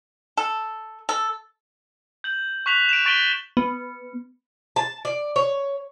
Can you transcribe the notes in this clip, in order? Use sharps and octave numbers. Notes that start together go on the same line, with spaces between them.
A4
A4
G6 F#7
C#6 F#6 B6 F7 F#7
D7 E7
C#6 A6 B6 D7 F#7 G7
B3
A5
D5
C#5